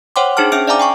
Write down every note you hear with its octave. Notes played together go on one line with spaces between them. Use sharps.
C5 C#5 F#5 G5 C6 D6
D4 D#4 G#4 C5 A5 F6
C#4 E5 G5 F6 D7
D5 E5 F5 G#5 A#5 D6
G5 G#5 C#6